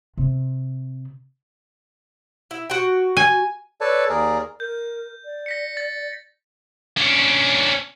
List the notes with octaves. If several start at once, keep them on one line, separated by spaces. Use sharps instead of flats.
C3
E4
F#4 G5
G#5
A4 B4 C#5 D5 A5
D#2 G#4 A#4 D5
A#4 G6
D5
A#6 B6 C#7
A6
C#4 D4